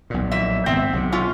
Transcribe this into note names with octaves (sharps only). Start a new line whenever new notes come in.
B1 A#2
F2 E5
G#1 B3 C4 E5
B1 C3
C#4 F4